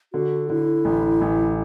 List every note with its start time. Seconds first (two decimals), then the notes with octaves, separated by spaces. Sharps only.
0.13 D3 F#4
0.50 D3 E4
0.85 A1
1.21 A1